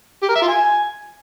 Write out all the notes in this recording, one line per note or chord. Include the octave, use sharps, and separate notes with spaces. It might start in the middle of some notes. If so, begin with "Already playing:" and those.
G4
A#4
E5
F4
G#5